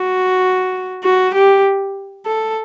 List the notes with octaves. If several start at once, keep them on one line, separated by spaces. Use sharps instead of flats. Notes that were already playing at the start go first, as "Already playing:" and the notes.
Already playing: F#4
F#4
G4
A4